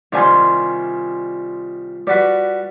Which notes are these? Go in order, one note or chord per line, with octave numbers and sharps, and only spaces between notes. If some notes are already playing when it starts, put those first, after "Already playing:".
C2 D#3 G3 F4 G#5 C6
G3 F#4 B4 D5